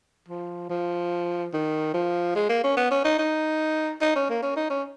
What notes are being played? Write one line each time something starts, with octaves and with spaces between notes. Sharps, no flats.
F3
F3
D#3
F3
G#3
A#3
C#4
B3
C#4
D#4
D#4
D#4
C#4
A#3
C#4
D#4
C#4